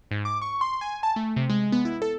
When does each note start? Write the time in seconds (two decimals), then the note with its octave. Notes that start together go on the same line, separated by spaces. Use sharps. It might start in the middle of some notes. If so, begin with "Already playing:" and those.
0.11 G#2
0.25 D6
0.42 C#6
0.61 C6
0.81 G#5
1.03 A5
1.16 A3
1.36 C3
1.50 G#3
1.72 B3
1.85 E4
2.02 A4